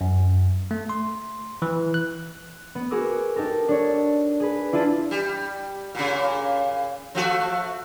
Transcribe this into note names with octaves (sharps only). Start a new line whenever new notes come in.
F#2
A3
C6
E3
F#6
B3
F#4 G#4 A#4 D6 E6
D#4 G4 A4 A#4
D4 C#5
G#4 B4
D4 E4 F4 A5 D#7
G3
A#2 C#3
F3 A3 F#4